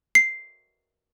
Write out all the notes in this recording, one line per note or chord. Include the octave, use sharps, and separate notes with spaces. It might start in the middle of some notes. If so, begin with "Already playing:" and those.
C7